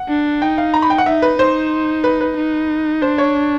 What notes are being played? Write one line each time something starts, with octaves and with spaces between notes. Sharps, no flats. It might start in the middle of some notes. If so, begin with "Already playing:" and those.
Already playing: F#5
D4
D#4 G5
F5
A#5
B5
G5
F#5
D#4 E5
B4
D#4 C5
B4
B4
D#4
D4 C5
C#5